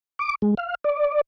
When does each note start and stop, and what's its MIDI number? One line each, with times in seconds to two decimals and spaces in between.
0.19 0.35 86
0.42 0.55 56
0.57 0.75 77
0.84 1.21 74